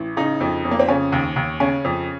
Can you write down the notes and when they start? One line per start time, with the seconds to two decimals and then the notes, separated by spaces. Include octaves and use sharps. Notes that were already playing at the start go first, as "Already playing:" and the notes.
Already playing: A1
0.17 C#3 D#4
0.40 F2
0.65 F2
0.71 A#3
0.79 C4
0.89 C#3 C#4
1.12 D#2
1.36 D#2
1.60 C#3 C#4
1.84 F2